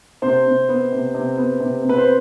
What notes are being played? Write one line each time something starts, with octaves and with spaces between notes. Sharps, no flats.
C3 C5
C3
B3
C3
C3
B3
C3
C3
B4
C5